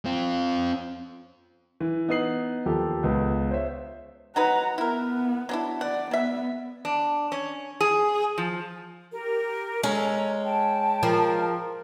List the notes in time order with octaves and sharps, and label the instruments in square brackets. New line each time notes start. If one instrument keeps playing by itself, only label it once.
[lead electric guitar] C4 F4
[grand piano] E3
B3 D#4 D#6 C7 F#7
D#2 F3 G4 A4
C#2 B3
C5 C#5 E5
[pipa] F#3 D#4 B4 [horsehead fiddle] F#5 A#5
[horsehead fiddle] B3 [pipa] E4 A#4
[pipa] F#3 D4 E4
[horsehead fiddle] D5 [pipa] F#5
[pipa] F#3 E5 [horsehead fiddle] B3
[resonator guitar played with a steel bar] D4
C#4
G#4
F3
[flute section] G4 A#4
[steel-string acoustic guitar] G#3 C#4 [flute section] A4 A#5
[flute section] G5 A5
[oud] F3 [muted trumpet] A#4